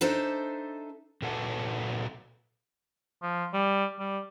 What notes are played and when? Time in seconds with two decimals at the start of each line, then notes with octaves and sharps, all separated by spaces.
0.01 D4 D#4 A4 C5 E5
1.22 A#2 F#4 A4 B4 F#5 A5
3.22 F3
3.54 G3
3.99 G3